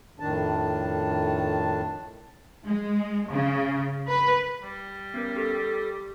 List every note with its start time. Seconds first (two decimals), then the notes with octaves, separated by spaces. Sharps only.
0.20 F2 A2 D#3 D4 A5
2.67 G#3
3.31 C#3
4.07 B4
4.62 G3
5.14 B3 C#4 A#4
5.37 G4 A4